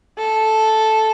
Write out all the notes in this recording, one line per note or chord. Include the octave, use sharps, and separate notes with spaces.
A4